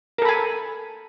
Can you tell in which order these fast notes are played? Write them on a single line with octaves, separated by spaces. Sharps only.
A#4 A4 B5 G#5